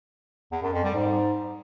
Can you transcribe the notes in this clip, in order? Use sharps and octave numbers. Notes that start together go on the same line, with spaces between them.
E2
F#2
F2
G3
G#2